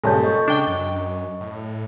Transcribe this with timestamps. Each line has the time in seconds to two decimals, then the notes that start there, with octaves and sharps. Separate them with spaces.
0.04 G2 A#2 C#3 G#3 A4 A5 G6
0.24 D#5 C#6
0.48 C#3 D4 G5
0.67 F#2
1.41 A2